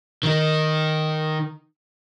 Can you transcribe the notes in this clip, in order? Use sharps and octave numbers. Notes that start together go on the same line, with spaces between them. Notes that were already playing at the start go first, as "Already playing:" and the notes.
D#3 D#4